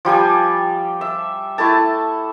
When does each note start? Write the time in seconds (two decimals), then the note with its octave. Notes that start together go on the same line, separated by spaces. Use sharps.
0.05 F3 G3 G4 G#5
1.01 E5
1.58 A3 E4 A4 A5